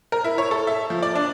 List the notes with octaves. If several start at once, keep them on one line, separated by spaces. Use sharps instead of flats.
A#4
E4
C#5
A4
E5
F3
D5
D4